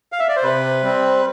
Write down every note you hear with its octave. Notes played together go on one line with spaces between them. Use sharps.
F5
E5
D5
C5
C3 B4
G3 C4